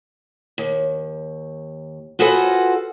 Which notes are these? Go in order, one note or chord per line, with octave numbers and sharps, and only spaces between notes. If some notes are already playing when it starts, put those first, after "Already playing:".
D#2
F4 F#4 G#4 A4 B4 C5